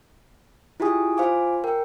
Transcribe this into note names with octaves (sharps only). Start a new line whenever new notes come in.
E4 F4 G4 G#4 G#5 D#6
F4 C5 F5 G#5 D6
A#4 G5